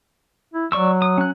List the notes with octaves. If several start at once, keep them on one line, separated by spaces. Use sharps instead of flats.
E4
F#3 D5 C#6 E6
D#6
C#4 F#6